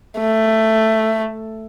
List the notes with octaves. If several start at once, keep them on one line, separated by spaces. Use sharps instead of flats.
A3